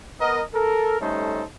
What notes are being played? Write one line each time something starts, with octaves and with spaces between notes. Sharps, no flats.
B3 A#4 D#5
A4 A#4
G3 A3 C#4 D#4 A4 C5